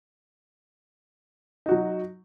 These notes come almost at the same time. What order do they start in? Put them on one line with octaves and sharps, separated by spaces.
D#4 F#4 F#3